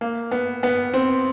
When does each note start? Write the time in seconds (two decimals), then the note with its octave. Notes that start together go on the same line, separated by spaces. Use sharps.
0.01 A#3
0.31 B3
0.63 B3
0.94 C4